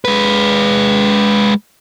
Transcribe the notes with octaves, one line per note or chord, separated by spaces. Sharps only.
G#3 B4